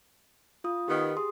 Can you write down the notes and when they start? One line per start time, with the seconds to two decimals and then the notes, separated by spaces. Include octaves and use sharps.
0.64 F4 D#6
0.88 D#3 B3 G4
1.17 G#4 C6 D#6